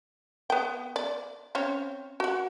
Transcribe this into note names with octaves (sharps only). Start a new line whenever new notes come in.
B3 G5
D5
C4 C#4 C#5
F#4 F#5